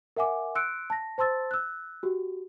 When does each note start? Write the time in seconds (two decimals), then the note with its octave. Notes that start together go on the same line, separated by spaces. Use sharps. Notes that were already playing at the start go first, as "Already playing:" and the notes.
0.16 A#4 E5 F#5 G#5 D6
0.55 C6 E6 F#6 C#7 D7
0.90 A5 A#6
1.18 C5 A5 C6 E6 A6
1.51 E6 F#6
2.03 F#4 G4